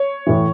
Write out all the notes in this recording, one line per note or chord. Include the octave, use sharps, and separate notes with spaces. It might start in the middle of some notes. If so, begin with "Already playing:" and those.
Already playing: C#5
A2 E3